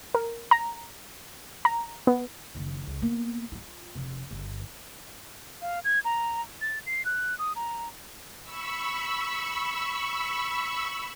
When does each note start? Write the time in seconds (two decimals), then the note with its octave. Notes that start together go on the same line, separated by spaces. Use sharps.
0.15 A#4
0.51 A#5
1.65 A#5
2.07 B3
2.55 F#1 D#3
2.87 C#2
3.02 A#3 B3
3.52 D#4 F4
3.95 F1
4.31 G1
5.62 F5
5.84 G#6
6.05 A#5
6.61 A6
6.86 C7
7.05 F#6
7.39 D#6
7.56 A#5
8.43 B5 C#6 E6